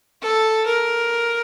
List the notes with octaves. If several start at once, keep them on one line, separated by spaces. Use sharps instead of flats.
A4
A#4